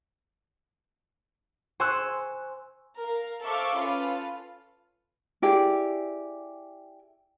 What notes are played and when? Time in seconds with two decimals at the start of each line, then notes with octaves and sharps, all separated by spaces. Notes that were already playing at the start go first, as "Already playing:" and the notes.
1.80 C5 G#5 C6 C#6 E6 F#6
2.99 A#4 F5
3.43 A4 C5 E5 F5 C#6 D6
3.77 C#4 F4 A4 B4 F5
5.42 E4 G4 G#4 D5